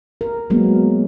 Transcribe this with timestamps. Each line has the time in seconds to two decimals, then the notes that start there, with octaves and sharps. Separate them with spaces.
0.21 A#4
0.50 F#3 G#3 A#3 B3